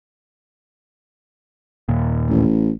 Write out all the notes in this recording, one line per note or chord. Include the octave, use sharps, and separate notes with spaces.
D#2 A#2
A1